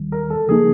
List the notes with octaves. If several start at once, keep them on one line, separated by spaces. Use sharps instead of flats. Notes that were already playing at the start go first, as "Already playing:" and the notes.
Already playing: D#2 D#3 G3
A#4
A4
C#3 F3 A#3 D#4 G#4